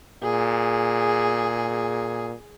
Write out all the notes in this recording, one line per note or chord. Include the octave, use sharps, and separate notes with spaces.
A#2 G#4